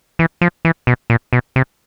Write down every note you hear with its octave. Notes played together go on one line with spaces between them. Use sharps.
E3
F3
E3
B2
A#2
B2
C3